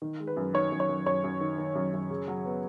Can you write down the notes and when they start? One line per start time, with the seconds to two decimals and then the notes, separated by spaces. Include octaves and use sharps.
0.02 D#3
0.20 G#3
0.27 B4
0.37 F#2
0.54 D#3 C#5
0.72 F#2
0.80 C#5
0.89 F#2
1.06 F#2 C#5
1.24 F#2
1.41 D#3
1.58 D#3
1.75 F#2
1.93 F#2
2.10 C#3
2.28 F#3
2.46 B3